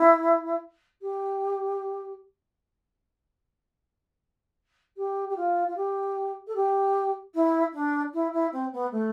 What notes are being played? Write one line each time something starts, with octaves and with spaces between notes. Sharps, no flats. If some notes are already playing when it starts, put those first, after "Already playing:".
Already playing: E4
G4
G4
G4
F4
F4
G4
A4
G4
E4
D4
E4
E4
C4
B3
A3